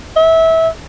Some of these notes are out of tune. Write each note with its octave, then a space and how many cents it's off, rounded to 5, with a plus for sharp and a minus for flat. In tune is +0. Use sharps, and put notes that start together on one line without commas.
E5 -20